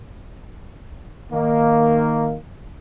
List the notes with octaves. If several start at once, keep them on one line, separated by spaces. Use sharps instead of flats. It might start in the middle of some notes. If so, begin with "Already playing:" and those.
D#3 A#3